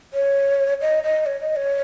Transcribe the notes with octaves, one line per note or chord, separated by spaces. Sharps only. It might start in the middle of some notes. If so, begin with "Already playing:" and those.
C#5
D#5
D#5
C#5
D#5
C#5